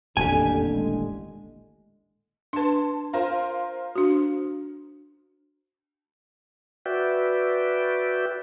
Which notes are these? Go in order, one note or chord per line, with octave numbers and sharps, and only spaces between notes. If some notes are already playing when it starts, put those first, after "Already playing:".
D#1 A1 F2 D3 A#3 G4 G#5
G#3
D4 B4 A5 C6
F4 A#4 C5
D4 F#4
F#4 B4 D5 E5 G5